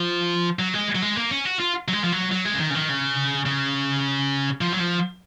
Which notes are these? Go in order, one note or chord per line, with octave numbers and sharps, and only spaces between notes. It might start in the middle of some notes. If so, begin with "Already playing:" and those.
Already playing: F3
F#3
G#3
F#3
G#3
A#3
C#4
F#4
F4
F#3
G#3
F3
F#3
F#3
G#3
C#3
D#3
C#3
D#3
C#3
C#3
F3
F#3
F3